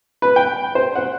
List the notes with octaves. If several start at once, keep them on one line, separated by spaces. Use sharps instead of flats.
B4
G5
C5
F#5